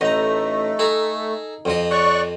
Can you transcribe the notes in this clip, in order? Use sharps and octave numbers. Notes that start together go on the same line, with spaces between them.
A1 A3 D#4 A#5
G#4 A4 A#5
F2 F3 D#5
C#5 D5 C#6 F#6